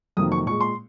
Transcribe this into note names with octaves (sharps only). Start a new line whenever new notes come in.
F2 C3 D#3 F#3 A#3 D#6
C#6
A#2 G#3 C#6
C6